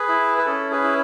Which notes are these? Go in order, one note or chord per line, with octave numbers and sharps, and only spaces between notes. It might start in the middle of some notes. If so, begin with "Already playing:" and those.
Already playing: G#4 B4
E4
B4
C#4 A4
G#4 B4
E4